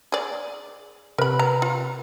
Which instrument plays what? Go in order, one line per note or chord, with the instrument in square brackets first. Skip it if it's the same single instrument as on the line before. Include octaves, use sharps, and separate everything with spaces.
[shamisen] G#4 D5
[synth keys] C3 B4 [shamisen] A#4 B5
[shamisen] A#5
F4